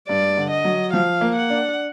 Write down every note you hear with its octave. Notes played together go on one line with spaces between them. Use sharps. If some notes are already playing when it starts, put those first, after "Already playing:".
G2 D5
D3
D#5
F#3
F3 F5
A#3
F#5
D4